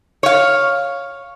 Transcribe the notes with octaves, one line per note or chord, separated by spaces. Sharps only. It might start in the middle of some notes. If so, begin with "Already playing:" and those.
C#5 F5